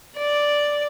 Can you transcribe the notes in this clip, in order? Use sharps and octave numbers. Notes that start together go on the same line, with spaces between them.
D5